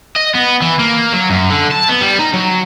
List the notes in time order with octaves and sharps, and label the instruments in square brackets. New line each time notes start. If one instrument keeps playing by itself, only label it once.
[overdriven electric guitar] D#5
B3
E3
A#3
F#3
F#2
D3
A5
B3
G3
D#4
F#3